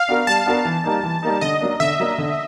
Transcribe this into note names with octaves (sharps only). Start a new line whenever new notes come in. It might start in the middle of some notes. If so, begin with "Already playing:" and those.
Already playing: F5
B3 D4 F#4 A#4
G3 A5
B3 D4 F#4 A#4
E3
G3 A#3 D#4
E3
G3 A#3 D#4
D3 D#5
F#3 A#3 D4
D3 E5
F#3 A#3 D4
D3